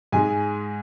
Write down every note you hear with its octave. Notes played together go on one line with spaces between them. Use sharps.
G#2 G#3 G#5